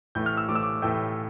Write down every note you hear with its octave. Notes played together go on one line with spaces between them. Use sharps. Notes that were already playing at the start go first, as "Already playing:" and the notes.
A2 E3 A3 G6
F6
E6
A2 E3 A3 D6
E6
D6
A2 E3 A3 G5